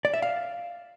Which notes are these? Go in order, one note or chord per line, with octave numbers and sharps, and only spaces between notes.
D5
E5
F5